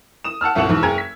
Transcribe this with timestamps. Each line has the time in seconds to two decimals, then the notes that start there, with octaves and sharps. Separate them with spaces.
0.25 D#6 E7
0.41 F#5 A5 E6 F6
0.55 G1 C2 B2 F#5 E7 F#7
0.69 E2 G#2 B2
0.82 F#1 G#4 G5 G#5 A#5 G#6
0.98 B6